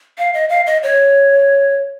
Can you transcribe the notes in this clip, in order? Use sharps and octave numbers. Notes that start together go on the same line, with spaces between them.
F5
D#5
F5
D#5
C#5